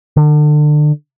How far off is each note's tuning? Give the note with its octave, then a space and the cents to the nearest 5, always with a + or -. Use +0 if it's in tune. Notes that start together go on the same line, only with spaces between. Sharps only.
D3 +35